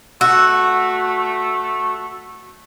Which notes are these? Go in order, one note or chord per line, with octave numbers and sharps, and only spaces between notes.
A3 F#4 E6